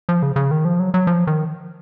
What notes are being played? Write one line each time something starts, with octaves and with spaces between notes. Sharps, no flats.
F3
C#3
C#3
D#3
F3
F#3
F#3
F3
D#3